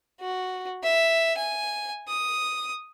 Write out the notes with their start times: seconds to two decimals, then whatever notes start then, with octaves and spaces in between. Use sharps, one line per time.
0.20 F#4
0.83 E5
1.38 G#5
2.09 D#6